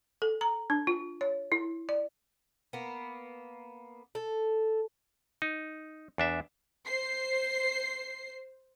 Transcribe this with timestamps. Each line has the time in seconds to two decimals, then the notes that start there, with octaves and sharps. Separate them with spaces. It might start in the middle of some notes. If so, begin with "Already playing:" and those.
0.22 A4
0.41 A#5
0.70 D4
0.87 F4
1.21 C#5
1.52 E4
1.89 D5
2.73 A#3 B3
4.15 A4
5.42 D#4
6.18 E2 D4 E5
6.86 C5 C7